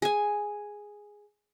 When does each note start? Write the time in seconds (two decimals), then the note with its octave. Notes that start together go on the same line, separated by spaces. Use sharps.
0.02 G#4 G#5